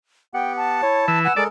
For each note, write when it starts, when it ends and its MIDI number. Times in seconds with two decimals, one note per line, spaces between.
0.34 0.81 59
0.34 0.81 67
0.34 0.79 78
0.34 0.53 79
0.57 1.19 81
0.83 1.22 64
0.83 1.04 73
1.08 1.28 52
1.08 1.38 88
1.25 1.33 71
1.25 1.35 78
1.25 1.33 80
1.37 1.47 56
1.37 1.47 69
1.37 1.47 70
1.37 1.44 74